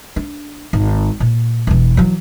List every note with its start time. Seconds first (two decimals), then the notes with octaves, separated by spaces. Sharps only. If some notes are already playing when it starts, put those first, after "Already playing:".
0.16 D4
0.73 G#1
1.20 A#2
1.67 E1 E3
1.97 E3 F#3